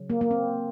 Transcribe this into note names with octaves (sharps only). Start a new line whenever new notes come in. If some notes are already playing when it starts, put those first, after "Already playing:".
Already playing: C#3 F#3
A#3
A#3
C4